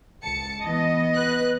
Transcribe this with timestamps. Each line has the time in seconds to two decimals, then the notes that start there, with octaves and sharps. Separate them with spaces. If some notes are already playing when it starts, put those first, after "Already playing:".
0.24 C#2 A5 C#7
0.63 E3 B3 D#5
1.15 B4 F#6